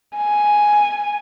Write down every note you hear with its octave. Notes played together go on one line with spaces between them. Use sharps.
G#5